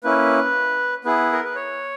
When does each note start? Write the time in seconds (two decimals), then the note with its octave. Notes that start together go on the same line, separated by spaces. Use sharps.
0.04 A#3 C#4 E4 B4
1.05 B3 E4 G#4 B4
1.32 A#4
1.44 B4
1.55 C#5